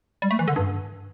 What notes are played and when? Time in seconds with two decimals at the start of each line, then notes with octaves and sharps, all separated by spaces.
0.22 G3
0.31 A3
0.39 E3
0.48 D3
0.56 G2